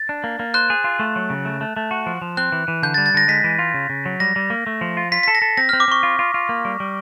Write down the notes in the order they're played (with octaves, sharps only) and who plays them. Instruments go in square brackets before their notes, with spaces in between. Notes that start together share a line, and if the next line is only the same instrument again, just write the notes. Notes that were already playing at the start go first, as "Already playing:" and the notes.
Already playing: [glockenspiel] A6
[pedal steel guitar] D4
A#3
A#3
[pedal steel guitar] C5 [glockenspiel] F#6
[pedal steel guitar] G#4
F4
A3
F#3
C#3
A3
A3
A3
F#4
F3
F3
[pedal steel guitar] C4 [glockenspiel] F#6
[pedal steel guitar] E3
E3
[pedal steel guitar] D3 [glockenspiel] G6
[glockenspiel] A6
[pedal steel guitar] G3
[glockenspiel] A6
[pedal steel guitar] D3 [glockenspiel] A#6
[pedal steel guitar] G#3 [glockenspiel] B6
[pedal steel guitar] E3
F4
C#3
C#3
F#3
[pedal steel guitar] G3 [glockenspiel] A#6
[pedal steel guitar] G3
A#3
A3
F3
F4
[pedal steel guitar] F4 [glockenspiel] B6
[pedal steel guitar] A4 [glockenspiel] B6
[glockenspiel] A#6
[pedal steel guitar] A4
[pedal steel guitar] C4 [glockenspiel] A#6
[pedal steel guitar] C4 [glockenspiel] F6
[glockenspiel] D6
[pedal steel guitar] C4 [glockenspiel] C#6
[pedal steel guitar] F4
F4
F4
A#3
G3
G3